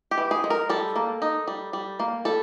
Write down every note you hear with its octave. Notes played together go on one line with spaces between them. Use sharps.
G4
E3
G#4
G#3
A#4
G3 A4
A#3
D#4
G3
G3
A#3
G3 A4